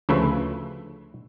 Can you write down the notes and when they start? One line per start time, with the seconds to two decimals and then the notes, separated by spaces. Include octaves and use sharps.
0.09 D2 C#3 F3 A3 B4 E5